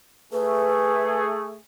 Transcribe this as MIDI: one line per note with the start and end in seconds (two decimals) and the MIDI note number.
0.33 1.59 57
0.33 1.59 68
0.33 1.22 71